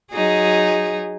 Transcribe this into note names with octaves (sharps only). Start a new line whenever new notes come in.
F#3 D#4 G#4